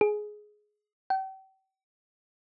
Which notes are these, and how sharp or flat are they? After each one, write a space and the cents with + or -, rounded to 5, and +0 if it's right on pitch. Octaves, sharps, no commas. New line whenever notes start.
G#4 +15
G5 -40